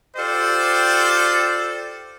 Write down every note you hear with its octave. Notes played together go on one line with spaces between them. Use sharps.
F4 G4 A4 C5 D5